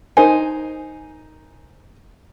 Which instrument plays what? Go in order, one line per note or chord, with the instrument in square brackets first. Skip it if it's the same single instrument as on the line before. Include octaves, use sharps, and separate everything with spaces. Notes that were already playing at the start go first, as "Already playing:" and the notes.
[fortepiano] D#4 A#4 C5 [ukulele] G#5